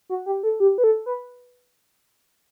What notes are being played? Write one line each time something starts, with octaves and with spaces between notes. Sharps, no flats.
F#4
G4
A4
G4
B4
A4
B4